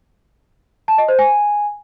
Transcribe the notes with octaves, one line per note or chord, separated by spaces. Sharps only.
A5
D#5
C5
G#5